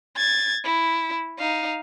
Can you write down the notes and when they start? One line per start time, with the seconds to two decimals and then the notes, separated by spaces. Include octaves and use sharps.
0.17 G#6 A6
0.65 E4
1.38 D#4 F5